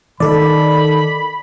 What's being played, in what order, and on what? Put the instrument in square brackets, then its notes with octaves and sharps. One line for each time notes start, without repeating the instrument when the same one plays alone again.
[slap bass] D#3 [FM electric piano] A4 D5 [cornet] B5